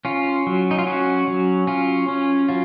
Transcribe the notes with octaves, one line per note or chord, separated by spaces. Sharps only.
C#4 F4
F#3
D#4
F4
C#4 F#4
F#3
C#4 F4
C#4
F#3 F4